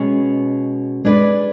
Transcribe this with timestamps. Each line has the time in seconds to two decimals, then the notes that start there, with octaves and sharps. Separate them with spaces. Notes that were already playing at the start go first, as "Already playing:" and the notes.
Already playing: B2 G#3 C#4 G#4
1.05 G#3 D4 G#4 B4 D5